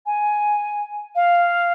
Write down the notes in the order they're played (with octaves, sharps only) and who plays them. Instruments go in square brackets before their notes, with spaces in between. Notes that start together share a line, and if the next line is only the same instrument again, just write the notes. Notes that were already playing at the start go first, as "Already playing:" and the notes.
[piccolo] G#5
F5